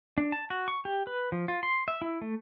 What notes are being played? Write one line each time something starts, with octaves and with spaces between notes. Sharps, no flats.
D4
A5
F#4
C#6
G4
B4
F3
F4
C6
E5
E4
A3